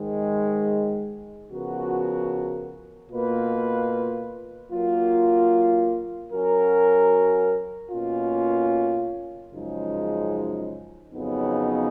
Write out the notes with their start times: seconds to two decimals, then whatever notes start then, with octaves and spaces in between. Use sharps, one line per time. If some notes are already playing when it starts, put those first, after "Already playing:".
Already playing: G#2 D#3 G#3
1.49 C#3 F3 B3 F#4 A#4
3.10 B2 A#3 F4 B4
4.70 F#3 A#3 F4 A#4
6.31 F#3 C#4 F#4 A#4
7.92 B2 A#3 C#4 F4
9.53 F#2 C#3 F3 G#3 D#4
11.12 F2 C#3 F#3 B3 D#4